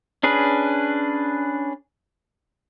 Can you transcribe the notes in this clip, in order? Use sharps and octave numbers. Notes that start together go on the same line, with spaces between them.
C#4 D4 G#4 B4